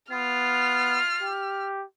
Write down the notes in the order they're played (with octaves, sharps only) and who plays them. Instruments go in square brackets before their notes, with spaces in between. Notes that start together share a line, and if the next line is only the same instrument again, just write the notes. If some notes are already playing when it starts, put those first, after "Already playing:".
[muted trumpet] B3 [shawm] F4 [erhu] F6
[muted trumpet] G4